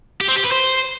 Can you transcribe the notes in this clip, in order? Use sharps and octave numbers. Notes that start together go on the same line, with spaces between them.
G4
C4
G4
B4
C5